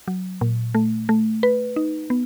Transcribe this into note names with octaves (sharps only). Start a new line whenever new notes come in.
F#3
A#2
A3
A3
B4
D#4
B3